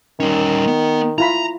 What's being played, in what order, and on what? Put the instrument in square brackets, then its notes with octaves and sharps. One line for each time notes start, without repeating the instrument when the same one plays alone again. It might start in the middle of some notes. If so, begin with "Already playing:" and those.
[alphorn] D#3 [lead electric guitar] G3 C#4
[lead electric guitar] B3
[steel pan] E4 F4 B5 [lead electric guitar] A#5